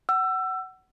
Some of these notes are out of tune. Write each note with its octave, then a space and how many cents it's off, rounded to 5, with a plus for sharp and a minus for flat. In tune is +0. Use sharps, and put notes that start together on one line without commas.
F#5 +20 E6 +25